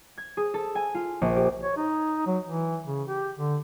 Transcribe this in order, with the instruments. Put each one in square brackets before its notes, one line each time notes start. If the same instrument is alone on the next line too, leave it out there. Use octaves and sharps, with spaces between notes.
[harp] G#6
G#4
A4
G#5
F4
A#1
G4
[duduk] C#5
D#4
F#3
E3
C#3
G4
D3